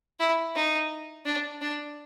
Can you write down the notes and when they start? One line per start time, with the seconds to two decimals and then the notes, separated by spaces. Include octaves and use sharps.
0.20 E4
0.55 D#4
1.25 D4
1.61 D4